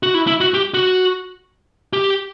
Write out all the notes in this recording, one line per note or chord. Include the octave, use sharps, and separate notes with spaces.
F#4
E4
E4
F#4
G4
F#4
G4